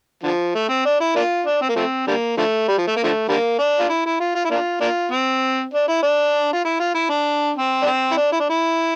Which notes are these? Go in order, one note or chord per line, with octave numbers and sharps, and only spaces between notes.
D3 F3
A3
C4
D4
E4
A#3 D4 F4
D4
C4
A#3
F3 A3 C4
D3 G3 A#3
D3 F3 A3
G3
F3
A3
A#3
D3 F3 A3
D3 G3 A#3
D4
F4
E4
E4
F4
F4
E4
A#3 D4 F4
A#3 D4 F4
C4
D4
E4
D4
F4
E4
F4
E4
D4
C4
D4
C4
E4
D4
E4
D4
E4